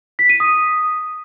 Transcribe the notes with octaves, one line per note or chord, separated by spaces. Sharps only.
B6
D#7
D#6